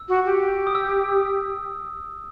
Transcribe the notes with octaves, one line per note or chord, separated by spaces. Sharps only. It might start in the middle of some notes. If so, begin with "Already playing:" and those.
Already playing: E6
F#4
G4
D#6
E6